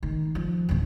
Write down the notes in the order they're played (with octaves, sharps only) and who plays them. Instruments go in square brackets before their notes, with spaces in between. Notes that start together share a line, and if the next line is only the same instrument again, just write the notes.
[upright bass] D#3
F3
E1 A#1